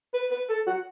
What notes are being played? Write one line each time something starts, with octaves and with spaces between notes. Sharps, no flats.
B4
B4
A4
F#4